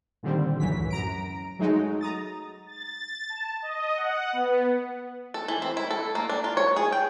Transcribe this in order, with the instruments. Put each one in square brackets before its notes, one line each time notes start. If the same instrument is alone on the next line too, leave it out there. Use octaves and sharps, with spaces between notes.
[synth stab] A#2 D3 D#3 G3 C4
C#2 F#2 A2 E3 F#3 B6
F#2 A#5 D7
F#3 G#3 A3 D#4 F#4
A#5 D#6 A6
[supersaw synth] A6
A5
D#5
F#5
B3
[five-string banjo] A4
E3
C4
E4
A4
A#3
D4
F4
C#5
G#4
G5